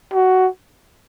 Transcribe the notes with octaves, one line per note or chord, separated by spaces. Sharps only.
F#4